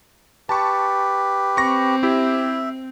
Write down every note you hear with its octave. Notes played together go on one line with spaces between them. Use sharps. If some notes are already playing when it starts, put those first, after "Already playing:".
G4 B4 A5 C#6
C4 C#6 A#6
E4 G4 E5